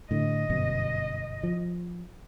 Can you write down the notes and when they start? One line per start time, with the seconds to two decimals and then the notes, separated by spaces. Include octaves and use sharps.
0.11 A2 D3 D#5
0.49 G1 F#2 B2
1.43 F3